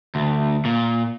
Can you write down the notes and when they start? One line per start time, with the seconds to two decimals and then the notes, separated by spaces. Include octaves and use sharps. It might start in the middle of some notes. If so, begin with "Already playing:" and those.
0.15 D2
0.65 A#2